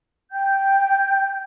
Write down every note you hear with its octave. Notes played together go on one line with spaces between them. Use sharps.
G5 G6